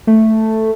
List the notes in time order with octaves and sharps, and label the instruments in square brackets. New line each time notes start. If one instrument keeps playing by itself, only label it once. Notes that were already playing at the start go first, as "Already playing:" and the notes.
[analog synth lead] A3